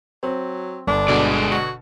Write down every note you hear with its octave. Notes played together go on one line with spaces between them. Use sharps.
F#3 C4
G1 D4
B2 D3 G#3 D5
F#4